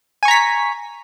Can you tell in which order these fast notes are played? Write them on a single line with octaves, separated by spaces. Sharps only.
G#5 C#6 A#5 B6